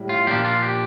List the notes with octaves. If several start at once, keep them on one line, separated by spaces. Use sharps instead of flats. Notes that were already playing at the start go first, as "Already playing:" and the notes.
Already playing: A2 G3
F4
A#2 F3 A#3 D4 F4 G4
F4
G4